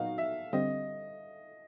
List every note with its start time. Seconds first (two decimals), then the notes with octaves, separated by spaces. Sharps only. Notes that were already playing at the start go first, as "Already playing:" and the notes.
Already playing: A#2 F#3 B3 D#4 F#4 F5
0.18 E5
0.53 D3 G3 C4 D#5